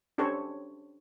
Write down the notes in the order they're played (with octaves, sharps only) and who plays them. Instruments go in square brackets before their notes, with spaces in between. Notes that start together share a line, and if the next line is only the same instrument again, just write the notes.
[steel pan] C#4 D4 G4 A4 C5 C#5